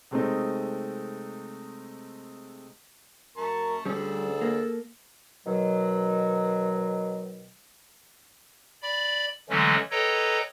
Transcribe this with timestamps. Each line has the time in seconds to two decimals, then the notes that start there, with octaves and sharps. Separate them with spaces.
0.11 C3 G#3 A3 C4 C#4 D#4
3.37 F#2 A#4 A5 C#6
3.85 D2 G3 C#4 G#4 A4
4.42 A#3
5.45 B2 D#3 F#3
8.82 D5 B5
9.50 D3 E3 F#3 G#3 A3 C#4
9.91 A4 B4 C#5 D#5 G5 A#5